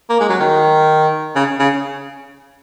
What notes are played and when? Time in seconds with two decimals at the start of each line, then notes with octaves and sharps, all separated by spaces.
0.10 A#3
0.20 G#3
0.29 F#3
0.40 D#3
1.35 C#3
1.60 C#3